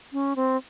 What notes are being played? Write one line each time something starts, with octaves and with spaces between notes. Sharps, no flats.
C#4
C4